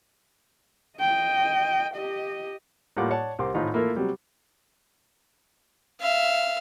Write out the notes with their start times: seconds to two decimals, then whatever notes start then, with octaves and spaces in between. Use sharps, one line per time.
0.99 D#5 G5
1.95 G4 D#5
2.97 A2 G3 A#3 F4 F#5 D6
3.11 C#5 D5 F#5 A5
3.39 C2 G4 A#4 C6 D6
3.54 G#1 A2 D#4 F4 B5
3.73 A3 A#3 E4 F4 A4 A#4
3.96 C3 F#3 G3
6.01 E5 F5